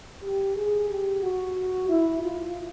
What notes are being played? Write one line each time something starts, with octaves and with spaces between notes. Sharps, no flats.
G4
G#4
G4
F#4
E4
F4